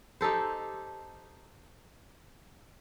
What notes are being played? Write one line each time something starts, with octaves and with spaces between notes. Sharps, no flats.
D#4 G4 A4 C5